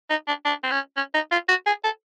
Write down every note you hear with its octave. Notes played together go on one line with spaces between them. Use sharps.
D#4
D4
D4
C4
C#4
C#4
D#4
F4
F#4
G#4
A4